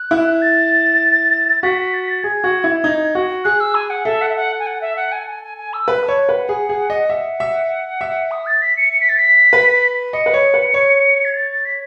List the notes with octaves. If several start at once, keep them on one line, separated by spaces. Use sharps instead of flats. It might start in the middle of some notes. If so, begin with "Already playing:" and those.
Already playing: F#6
E4
A6
F#4 B6
B6
A6
B6
A6
G#4 G#6
F#4
E4
D#4
F#4
G#4 F#6
E6
G#5
F#5
A4 E5
F#5
E5
F#5
G#5
F#5
E5
F#5
G#5
G#5
G#5
G#5
E6
B4 F#6
A5
C#5
B4 F#5
G#4
G#4
D#5
E5 F#5
E5
E5
D#6
A6
B6
C#7
C#7
B6
A6
B6
B4
D#5 C#7
B4
C#5
B4
C#5
G#6
A6
A6
B6